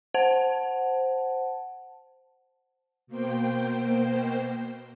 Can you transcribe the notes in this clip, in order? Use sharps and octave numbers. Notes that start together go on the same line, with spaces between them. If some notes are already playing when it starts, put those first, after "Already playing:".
C5 F#5 A5
B2 A#3 C5 G5